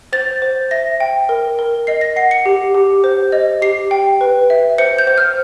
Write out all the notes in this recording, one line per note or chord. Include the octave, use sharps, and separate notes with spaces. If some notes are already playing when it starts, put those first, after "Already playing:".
C5 A6
C5
E5 A#6
G5
A#4
A#4
D#5 C7
A#6
F#5 C7
C#7
G4
G4
C5
D#5
G4 C7
G5
B4
E5
C5 C#7
G6
C5
F6